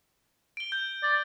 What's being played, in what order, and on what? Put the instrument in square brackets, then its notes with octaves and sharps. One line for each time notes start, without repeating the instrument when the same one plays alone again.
[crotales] D7 G7
G6
[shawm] D5